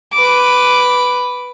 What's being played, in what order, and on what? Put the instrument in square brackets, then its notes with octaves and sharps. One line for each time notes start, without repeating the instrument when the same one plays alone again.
[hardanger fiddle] B4 D6